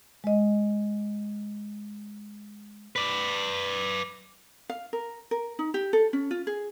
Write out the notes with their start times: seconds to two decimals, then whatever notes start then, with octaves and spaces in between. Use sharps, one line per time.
0.24 G#3 D#5
2.96 B4 D5
4.69 F5
4.93 A#4
5.31 A#4
5.59 D#4
5.74 G4
5.93 A4
6.13 C#4
6.31 F4
6.47 G#4